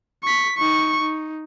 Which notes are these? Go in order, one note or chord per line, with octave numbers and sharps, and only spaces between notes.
C#6 B6
D#4 C#6
D#4